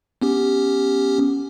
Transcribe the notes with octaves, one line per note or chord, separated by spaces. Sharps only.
B3 C#4 G4